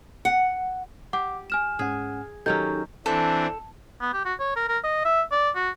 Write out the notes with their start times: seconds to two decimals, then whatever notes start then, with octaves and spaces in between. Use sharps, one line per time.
0.25 F#5
1.13 G4 F#5 D6
1.50 G#5 F6 E7
1.79 G#2 C#4 G#4 F#5
2.46 D#3 F#3 C#4 D#4 G4 A4 G6
3.06 E3 C4 D4 A4
4.01 B3
4.13 G4
4.25 F#4
4.40 C#5
4.56 A#4
4.69 A#4
4.84 D#5
5.05 E5
5.32 D5
5.55 F#4